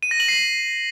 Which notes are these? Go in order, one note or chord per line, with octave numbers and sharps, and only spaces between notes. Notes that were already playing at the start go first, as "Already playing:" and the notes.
D#7
A#6
F#7
C7